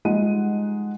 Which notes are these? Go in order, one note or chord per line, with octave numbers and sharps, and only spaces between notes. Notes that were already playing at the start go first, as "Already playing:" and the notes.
F3 G3 G#3 D#4 F#5 D#7